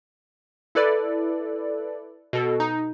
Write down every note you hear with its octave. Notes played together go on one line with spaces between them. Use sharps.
E4 A4 B4 D5
B2 A4
D#4